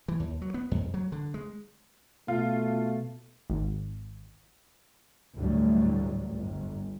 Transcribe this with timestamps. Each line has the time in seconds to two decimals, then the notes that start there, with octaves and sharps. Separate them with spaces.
0.08 E3
0.20 D#2
0.42 F#3
0.54 B3
0.71 F2
0.94 F#3
1.12 D3
1.34 G#3
2.28 B2 A3 F4
3.50 G#1
5.36 A1 D2 A2 F#3 G3
6.33 G1